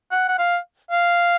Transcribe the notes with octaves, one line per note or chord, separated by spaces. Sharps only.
F#5
F#5
F5
F5